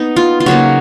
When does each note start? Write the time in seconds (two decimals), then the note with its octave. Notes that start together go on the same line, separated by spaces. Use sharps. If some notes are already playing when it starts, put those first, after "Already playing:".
Already playing: B3 D#4
0.16 F4
0.40 F4
0.46 C#3 F#3 A#3 D#4 F#4